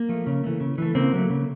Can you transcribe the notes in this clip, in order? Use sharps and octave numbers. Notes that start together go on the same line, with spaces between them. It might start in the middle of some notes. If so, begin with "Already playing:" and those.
Already playing: A#3
F3 A3
C#3
E3 A3
C#3
E3 A3
C#3 A#3 C4
F#3 A3
C#3